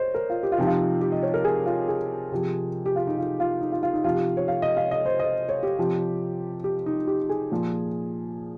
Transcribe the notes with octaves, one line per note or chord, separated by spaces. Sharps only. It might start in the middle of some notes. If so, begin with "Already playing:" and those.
Already playing: C5 C#5 D#5
A#4
F4
G4
F4
C3 F3 D#4
F4
G4
D#5
C#5
A#4
G#4
F4
G#4
C3 F3
G4
F4
D#4
F4
F4
D#4
F4
F4
D#4
C3 F3 F4
G4
C#5
F5
D#5
F5
D#5
C5
D#5
C#5
G4
C3 F3
G4
D#4
G4
G#4
A#2 F3